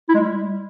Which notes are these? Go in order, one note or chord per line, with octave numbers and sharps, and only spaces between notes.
E4
G#3
G3